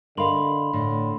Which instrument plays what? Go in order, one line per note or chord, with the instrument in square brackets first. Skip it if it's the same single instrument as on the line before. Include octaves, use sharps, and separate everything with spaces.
[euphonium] D3 [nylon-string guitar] A#4 D#5 F5 [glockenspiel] B5 C6 F#7
[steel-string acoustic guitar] A2 [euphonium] D3